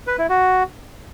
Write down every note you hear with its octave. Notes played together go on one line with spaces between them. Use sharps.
B4
E4
F#4